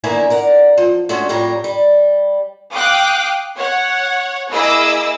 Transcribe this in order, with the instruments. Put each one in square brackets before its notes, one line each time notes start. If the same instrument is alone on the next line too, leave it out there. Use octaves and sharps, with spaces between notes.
[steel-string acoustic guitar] D3 D#3 A#3 B3 E4 G#5
A#4 D5 F#5
F3
G#3 A3 C#4 D4 F#4
F2 A2 G3 G4 C#5 A#5
G3
[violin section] F5 G5 D6 D#6 F#6
C#5 F#5
A#3 E4 G#4 D#5 D6 E6